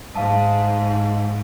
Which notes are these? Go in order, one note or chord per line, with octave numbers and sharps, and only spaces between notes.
G#2 F5 A5